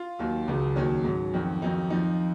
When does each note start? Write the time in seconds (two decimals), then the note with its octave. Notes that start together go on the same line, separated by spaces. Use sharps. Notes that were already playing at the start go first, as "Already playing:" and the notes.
Already playing: F4
0.19 D#2 D#3 F#3
0.48 C#2 C#3 F#3
0.76 D#2 D#3 F#3 C#4
1.04 G#2 F#3
1.34 F2 D#3 F#3
1.61 F2 D#3 F#3 D#4
1.90 F2 F3 D#4